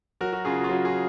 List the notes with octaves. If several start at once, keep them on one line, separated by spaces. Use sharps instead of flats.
F#3 F#4 A#4
F#4 A#4
C#3 F4 G#4
F#4
F4
F#3 F#4
F4 G#4